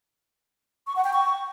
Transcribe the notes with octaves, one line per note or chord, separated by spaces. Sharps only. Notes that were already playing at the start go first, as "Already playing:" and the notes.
C#6
F#5
G5
C#6